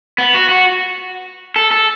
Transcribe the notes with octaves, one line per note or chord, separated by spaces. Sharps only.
B3
F#4
F#4
A4
A4